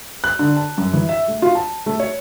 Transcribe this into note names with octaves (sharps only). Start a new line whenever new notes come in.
F#6
D3
A5
F#2
E3
E5
A3
F4
A5
A3
C#5